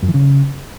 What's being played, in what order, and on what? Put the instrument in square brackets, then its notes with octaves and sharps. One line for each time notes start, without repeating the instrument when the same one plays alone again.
[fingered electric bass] F#2
E3
C#3